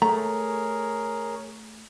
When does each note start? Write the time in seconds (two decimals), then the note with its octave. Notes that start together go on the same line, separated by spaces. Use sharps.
0.02 A3 G#4 A#4 C#5 A#5